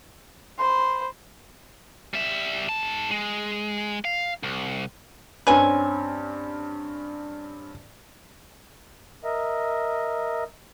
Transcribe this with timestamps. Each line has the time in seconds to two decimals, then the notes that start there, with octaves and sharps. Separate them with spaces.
0.59 C5 B5 C6
2.14 G3 E5
2.69 G#2 A5
3.11 G#3
4.05 F5
4.43 C2
5.47 G2 C4 C#4 B4 G#5
9.24 A#4 D#5 E5